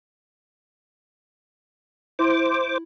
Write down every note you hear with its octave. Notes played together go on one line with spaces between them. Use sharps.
E4 C5 D6